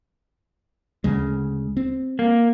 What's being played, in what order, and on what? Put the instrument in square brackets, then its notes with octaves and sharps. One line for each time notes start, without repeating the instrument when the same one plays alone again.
[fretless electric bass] D2 C#3 G#3
C4
[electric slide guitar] A#3